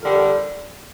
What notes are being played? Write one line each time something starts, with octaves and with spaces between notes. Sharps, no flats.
F2 D3 G3 A#4